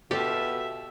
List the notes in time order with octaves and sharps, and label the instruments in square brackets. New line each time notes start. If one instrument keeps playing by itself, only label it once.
[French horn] B2 [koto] F4 G4 [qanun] A4 [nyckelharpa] E5